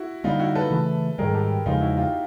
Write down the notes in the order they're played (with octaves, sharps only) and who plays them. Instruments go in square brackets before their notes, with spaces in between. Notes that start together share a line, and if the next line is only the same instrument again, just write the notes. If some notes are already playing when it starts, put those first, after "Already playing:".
Already playing: [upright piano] E4 F#4
[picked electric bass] D3 G3 A#3 [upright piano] D#4 F4
[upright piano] E4 F#4
A4 B4
[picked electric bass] C#3 E3 A3
[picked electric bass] G#2 D#3 G3 [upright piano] G#4 A#4
[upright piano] G4 A4
[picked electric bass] E2 C#3 F3 G#3 [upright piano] D#4 F4
[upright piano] E4 F#4
F4 G4